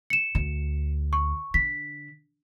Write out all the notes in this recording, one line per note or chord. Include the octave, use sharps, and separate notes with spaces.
C#7 E7
D2
C#6
D3 B6